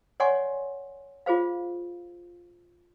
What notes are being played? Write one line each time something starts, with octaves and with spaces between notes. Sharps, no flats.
C#5 D5 F#5 G#5 C6 C#6
F4 G#4 C5 F5